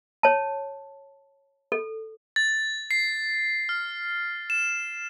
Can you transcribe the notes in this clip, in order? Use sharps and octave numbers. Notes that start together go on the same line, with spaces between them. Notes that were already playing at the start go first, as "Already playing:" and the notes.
C#5 A5
A4
A6
C7
F6
E7